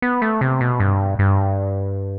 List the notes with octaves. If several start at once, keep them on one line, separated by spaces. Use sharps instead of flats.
B3
A3
C3
B2
G2
G2